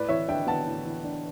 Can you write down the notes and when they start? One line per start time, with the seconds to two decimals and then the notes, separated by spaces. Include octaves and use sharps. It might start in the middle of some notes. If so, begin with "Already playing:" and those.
Already playing: A2 B4 D5
0.08 E3 C#5 E5
0.28 D4 E5 G5
0.47 B3 F#5 A5
0.67 A2
0.85 E3
1.04 D4